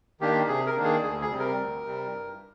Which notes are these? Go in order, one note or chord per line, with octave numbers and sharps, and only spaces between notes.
D#3 A#3 D4 G4
C3 G#4
A#4
D#3 A#3 D4
G#4
D2 G#4
G#4
C3 G3 C4
A#4
D2
C3 G3 C4
G2